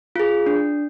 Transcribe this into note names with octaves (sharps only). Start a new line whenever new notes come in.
F4 G#4
D4